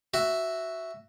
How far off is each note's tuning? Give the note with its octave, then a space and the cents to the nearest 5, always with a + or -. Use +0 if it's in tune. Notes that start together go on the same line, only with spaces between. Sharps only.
F#4 +0 E5 +0